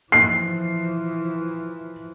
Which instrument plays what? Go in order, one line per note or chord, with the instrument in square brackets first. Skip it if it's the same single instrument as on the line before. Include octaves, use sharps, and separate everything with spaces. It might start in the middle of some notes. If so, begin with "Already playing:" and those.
[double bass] E3 F3 [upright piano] C7